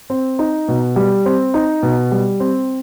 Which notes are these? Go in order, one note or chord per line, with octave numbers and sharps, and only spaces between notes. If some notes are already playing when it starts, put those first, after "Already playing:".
C4
D#4
B2
G3
C4
D#4
B2
G3
C4